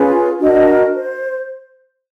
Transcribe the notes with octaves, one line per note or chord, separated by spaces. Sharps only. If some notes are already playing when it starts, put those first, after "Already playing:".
Already playing: C#4 F4 G#4 B4
D4 F#4 A#4 D#5
C5